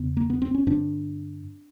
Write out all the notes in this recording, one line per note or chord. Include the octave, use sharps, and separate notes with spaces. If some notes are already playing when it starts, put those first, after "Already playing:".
Already playing: E2 C#3 B3
A#3
B3
C4
C#4
G2 D3 C4 D4